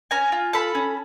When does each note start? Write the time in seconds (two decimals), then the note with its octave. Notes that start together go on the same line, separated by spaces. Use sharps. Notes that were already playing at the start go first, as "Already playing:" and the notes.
0.11 C#4 G#5 A#5
0.32 F4
0.53 A4 A5 B5
0.75 C#4